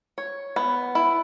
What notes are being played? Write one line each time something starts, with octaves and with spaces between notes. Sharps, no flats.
C#5
B3
E4